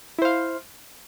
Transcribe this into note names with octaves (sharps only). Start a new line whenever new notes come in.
E4 C5 F5